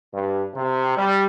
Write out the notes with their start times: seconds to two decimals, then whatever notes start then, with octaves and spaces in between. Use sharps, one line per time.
0.13 G2
0.55 C3
0.96 G3